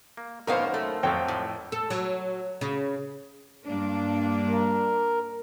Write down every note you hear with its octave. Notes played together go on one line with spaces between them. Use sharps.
A#3
F#2 A2 D#3 A#3 B3 A#4 C5 F5
A3
F2 F3 F#3 C4 C#5 G5
A2
A4
F#3
C#3
G2 A#3 D4
A#4